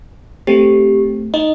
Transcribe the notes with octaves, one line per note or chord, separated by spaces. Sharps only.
A3 C4 G4
D#4 D#5